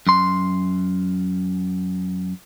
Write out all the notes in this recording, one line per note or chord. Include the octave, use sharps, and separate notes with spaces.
F#2 C6